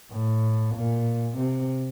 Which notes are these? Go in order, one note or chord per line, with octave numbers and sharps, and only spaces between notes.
A2
A#2
C3